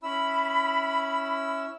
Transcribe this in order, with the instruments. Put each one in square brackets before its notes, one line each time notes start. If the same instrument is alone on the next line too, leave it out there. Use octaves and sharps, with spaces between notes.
[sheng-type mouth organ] C#4 E4 E6 [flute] B5